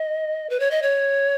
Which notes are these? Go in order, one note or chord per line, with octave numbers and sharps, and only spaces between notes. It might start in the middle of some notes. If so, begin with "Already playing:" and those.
Already playing: D#5
B4
C#5
D#5
C#5